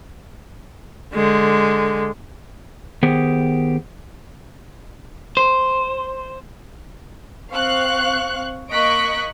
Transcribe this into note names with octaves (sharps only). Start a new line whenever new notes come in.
D3 G#3
D#3 B3 G4 G#4 C5
C5
C4 F5 C#6 F#6
A#3 D#5 C#6 F#6 B6 D7